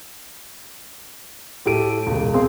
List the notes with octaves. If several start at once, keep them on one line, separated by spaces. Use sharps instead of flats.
A2 G4 A4 D7 D#7
E1 C#2
C4 G#4 F5 C6